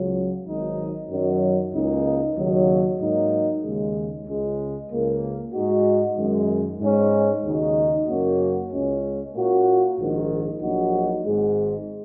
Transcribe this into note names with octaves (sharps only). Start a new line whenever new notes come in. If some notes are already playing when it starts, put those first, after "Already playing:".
Already playing: C#2 C#3 F#3
G#1 G#2 D#3 F#3 D#4
F#2 D#3 F#3
C#2 C#3 A#3 D#4
D#2 C#3 F#3 D#4
G#2 F#3 A#3 D#4
D#2 C#3 G#3
C#2 C#3 G#3
C#2 C#3 A#3
G#2 G#3 D#4 F#4
F#2 D#3 G#3
G#2 G#3 C#4
D#2 C#3 G#3 D#4 F#4
F#2 C#3 A#3 C#4 F#4
C#2 C#3 G#3 C#4
A#2 A#3 C#4 F#4
A#1 G#2 D#3
A#1 A#2 F#3 D#4 F#4
G#1 G#2 G#3